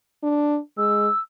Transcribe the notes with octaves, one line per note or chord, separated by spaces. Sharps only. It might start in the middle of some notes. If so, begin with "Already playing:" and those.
D4
G#3 E6